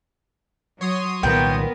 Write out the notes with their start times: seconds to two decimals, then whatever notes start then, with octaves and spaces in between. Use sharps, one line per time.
0.81 F#3 C#5 C6 D#6
1.23 C2 A#2 D#3 B3 A#4 G5